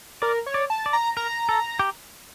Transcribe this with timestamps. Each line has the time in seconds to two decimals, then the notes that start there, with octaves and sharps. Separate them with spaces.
0.22 A#4 D5
0.46 C#5
0.54 D5
0.70 A5
0.86 D5
0.93 A#5
1.16 A#4 A#5
1.49 A4
1.79 G4